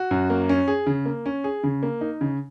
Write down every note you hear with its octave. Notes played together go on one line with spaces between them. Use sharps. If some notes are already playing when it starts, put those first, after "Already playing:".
Already playing: F#4
F#2
A#3
C#4
G#4
C#3
A#3
C#4
G#4
C#3
A#3
D#4
C#3